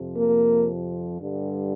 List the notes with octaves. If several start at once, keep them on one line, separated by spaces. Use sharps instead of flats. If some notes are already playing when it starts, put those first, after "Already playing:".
Already playing: F2 C3 F3
A#3
G2 D3 G3